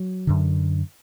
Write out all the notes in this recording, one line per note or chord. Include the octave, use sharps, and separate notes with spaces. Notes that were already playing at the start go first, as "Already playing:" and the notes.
Already playing: F#3
F#2 D3